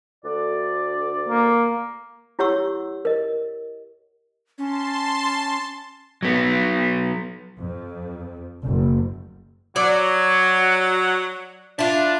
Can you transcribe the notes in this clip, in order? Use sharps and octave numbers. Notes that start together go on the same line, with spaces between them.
D2 D5
A#3
E4 G4 C#5 F#5 C#6 E6
A#4 D#5
C#4 A5 C6
F#3 B3
F2
F#1
F#3 D5
D4 E4 F4